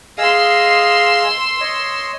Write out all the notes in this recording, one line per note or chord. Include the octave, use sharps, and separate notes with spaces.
G#4 D#5 F5 C6 E6
C#5 D#5